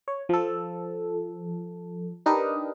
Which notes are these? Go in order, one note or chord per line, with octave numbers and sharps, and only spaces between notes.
C#5
F3 A4
D4 D#4 G4 A#4 B4 D#5